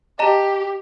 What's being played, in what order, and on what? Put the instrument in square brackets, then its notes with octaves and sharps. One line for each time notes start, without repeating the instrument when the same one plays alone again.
[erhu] G4 [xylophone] D#5 A5 A#5